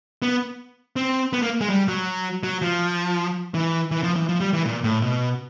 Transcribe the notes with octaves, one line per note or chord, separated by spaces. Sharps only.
B3
C4
B3
A#3
G#3
G3
F#3
F#3
F3
E3
E3
F3
E3
F3
G3
E3
A#2
A2
B2